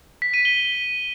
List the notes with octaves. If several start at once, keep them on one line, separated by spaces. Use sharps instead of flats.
B6
D#7
G7